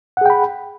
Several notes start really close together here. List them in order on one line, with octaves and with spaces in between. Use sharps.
F#5 G#4 G5 B5